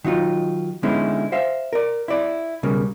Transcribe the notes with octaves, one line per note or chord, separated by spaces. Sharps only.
D#3 F#3 D#4 F4
D3 G#3 B3 C#4 D#4 E4
C5 E5 F5
A#4 D5
E4 D5
B1 C#3 G3 A#3